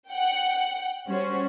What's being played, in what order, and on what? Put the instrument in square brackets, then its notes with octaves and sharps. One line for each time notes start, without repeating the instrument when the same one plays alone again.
[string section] F#5 G5
G3 C#4 F#4 C5